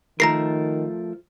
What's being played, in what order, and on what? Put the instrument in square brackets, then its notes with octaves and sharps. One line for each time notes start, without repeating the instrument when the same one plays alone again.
[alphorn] D#3 [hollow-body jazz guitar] F3 A3 A#4 [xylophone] A#5 A#6 C7